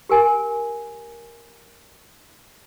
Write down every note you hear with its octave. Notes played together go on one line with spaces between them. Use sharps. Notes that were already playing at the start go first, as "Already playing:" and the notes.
G4 A#4 G#5